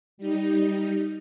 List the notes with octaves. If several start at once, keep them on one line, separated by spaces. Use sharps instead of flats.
G3 D#4